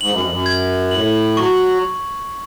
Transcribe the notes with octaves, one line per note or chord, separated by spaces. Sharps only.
G#2 F#7
F#2
F2
F#2
G#6
A2 F#7
F#3 C#6